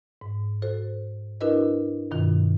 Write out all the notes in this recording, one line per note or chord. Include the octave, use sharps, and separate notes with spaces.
G#2
F#4 A4 C5
D4 E4 F#4 A#4 B4 D#5
G2 B2 D#3 F4